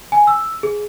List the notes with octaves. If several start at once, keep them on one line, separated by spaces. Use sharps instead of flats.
G#5
E6
G#4